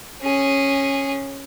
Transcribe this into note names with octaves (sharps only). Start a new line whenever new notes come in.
C#4 G#4